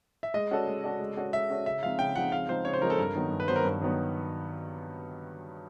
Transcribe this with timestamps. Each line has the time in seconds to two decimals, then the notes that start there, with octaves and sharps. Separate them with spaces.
0.23 E5
0.34 G#3 D#5
0.51 C#4 F#4 A4 D5
0.67 G#3
0.84 C#4 F#4 A4 D5
1.00 G#3
1.16 C#4 F#4 A4 D5
1.33 G#3 E5
1.50 C#4 F#4 A4 D5
1.66 C#3 E5
1.83 F3 G#3 C4 D#4 F5
1.99 C#3 G5
2.16 F3 G#3 C4 D#4 F#5
2.32 C#3 F5
2.49 F3 G#3 C4 D#4 C5
2.65 C#3 C#5
2.73 C5
2.82 F3 G#3 C4 D#4 A#4
2.90 A4
2.98 G2 A#4
3.15 D#3 F#3 B3
3.31 G2
3.40 B4
3.48 D#3 F#3 B3 C5
3.56 A#4
3.65 G2
3.81 D#3 F#3 B3